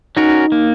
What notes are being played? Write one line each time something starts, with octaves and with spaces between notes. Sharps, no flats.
C#4 D#4 F#4 A#4
A#3